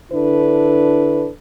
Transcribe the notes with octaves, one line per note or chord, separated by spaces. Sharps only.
D3 D4 E4 A4 B4